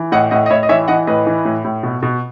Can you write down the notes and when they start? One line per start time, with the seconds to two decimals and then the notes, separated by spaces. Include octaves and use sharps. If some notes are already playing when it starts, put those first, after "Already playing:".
Already playing: E3
0.12 A2 D#5 F#5
0.31 A2 D#5 F#5
0.46 D#5
0.50 A2 C#5 E5
0.63 D#5
0.69 E3 C#5 E5
0.88 E3 D#5 F#5
1.07 A2 B4 D#5
1.27 E3
1.45 A2
1.64 A2
1.83 B2
2.02 B2